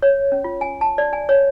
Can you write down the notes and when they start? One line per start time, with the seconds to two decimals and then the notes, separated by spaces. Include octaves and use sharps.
0.02 C#5
0.32 C#4
0.44 F4
0.61 G#5
0.81 A5
0.98 D5
1.13 G#5
1.29 C#5